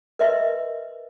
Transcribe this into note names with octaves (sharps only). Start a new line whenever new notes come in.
A#4 B4 D#5 E5 C6